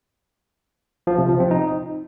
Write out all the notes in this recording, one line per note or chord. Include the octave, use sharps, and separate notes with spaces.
F3
C3
F3
C4
D#4